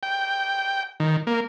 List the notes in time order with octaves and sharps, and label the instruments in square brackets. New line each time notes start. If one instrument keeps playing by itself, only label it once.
[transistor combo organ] G5
D#3
A#3